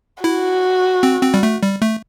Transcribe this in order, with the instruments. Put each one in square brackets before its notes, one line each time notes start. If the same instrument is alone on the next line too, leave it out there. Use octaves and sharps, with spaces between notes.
[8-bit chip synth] E4 [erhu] F#4
[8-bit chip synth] C4
C4
G3
A3
G3
A3